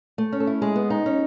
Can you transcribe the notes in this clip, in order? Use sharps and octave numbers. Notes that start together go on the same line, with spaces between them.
A3
C#4
A4
E4
G#3 G#4
B3
D#4
C#4